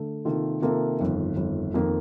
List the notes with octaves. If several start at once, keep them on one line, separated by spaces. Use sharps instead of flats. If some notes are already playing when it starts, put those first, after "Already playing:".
Already playing: D3 A3
C3 D#3 A#3 F4 A4
C3 D#3 A#3 F4 A4
G1 F2 D#3
G1 F2 D#3
F2 D#3 A#3